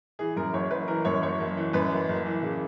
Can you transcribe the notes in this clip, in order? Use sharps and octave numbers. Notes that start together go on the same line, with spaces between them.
E3 G#4
F#2 A#4
F#1 C#5
F#1 B4
E3 A#4
F#2 C#5
F#1 C#5
F#1
E3
F#2 B4
F#1
F#1
E3
C#3